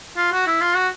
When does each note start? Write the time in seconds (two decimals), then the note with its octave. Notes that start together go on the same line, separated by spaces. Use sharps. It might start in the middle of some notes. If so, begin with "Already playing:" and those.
0.17 F4
0.32 F#4
0.47 E4
0.61 F4
0.76 F#4